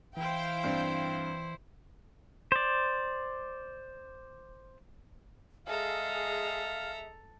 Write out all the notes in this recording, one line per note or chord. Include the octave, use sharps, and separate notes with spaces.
E3 E4 C5 F5 G5
G2 C4
C5 D5
G#3 G#4 A4 E5 F5 A#5